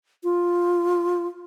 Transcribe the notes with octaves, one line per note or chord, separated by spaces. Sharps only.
F4